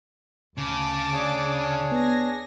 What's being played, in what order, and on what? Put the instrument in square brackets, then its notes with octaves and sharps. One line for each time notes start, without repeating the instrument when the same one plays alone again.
[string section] D2 A5 D6 [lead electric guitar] C#3
[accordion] D4 G#4 C#5
[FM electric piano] B3 [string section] G#5 A#6